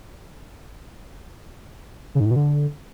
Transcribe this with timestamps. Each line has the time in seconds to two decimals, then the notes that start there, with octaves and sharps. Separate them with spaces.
2.15 C#3
2.20 G#2
2.25 A2
2.31 B2
2.36 D3